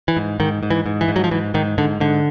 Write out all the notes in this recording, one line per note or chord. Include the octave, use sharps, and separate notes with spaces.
E3
G#2
G#2 D#3
G#2
E3
G#2
E3
G#2
F#3
F3
G#2 E3
G#2 D#3
G#2 D3
G#2 D3